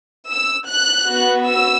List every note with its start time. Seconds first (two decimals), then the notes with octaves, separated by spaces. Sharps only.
0.30 E6
0.68 F#6
1.08 B3 F#4
1.46 E6